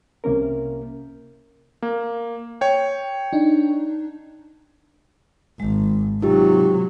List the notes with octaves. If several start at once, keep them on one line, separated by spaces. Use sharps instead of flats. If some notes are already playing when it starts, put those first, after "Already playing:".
C2 C3 A#3 C#4 A#4
A#3
C#5 G5
D4 D#4
G#1 D#3 G#3
C3 F#3 D#4 F4 G4